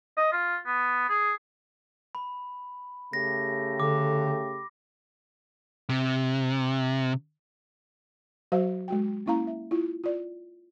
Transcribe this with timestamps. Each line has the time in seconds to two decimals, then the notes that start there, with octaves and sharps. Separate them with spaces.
0.17 D#5
0.32 F4
0.66 B3
1.09 G#4
2.15 B5
3.13 C#3 A3 G4 A#6
3.80 D3 D6
5.89 C3
8.52 F#3 F#4 C5 F5
8.88 G#3 F#4 G5
9.26 A#3 C#4 E4 F5 A#5
9.47 E5
9.71 E4 F4
10.04 F4 D5